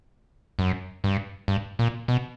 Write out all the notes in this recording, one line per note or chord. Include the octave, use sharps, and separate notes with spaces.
F#2
G2
G2
A#2
B2